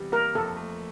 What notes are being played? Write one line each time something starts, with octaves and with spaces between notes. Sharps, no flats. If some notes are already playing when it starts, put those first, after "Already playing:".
Already playing: E2 C3 G3
A#3 A#4
F2 A4
A3